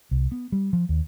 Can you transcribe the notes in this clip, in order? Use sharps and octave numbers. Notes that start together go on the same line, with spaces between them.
C2
B3
G3
F3
D#2